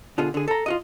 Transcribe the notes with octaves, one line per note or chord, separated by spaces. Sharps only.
B2 D3 F4 G#4
D3 G#4
A4 A#5
F4 F#4 D#5